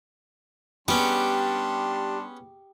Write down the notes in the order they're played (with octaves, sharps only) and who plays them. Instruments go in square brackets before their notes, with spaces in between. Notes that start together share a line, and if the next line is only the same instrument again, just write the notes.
[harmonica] G3 D4 C6 [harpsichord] B3 C#4 [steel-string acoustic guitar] G4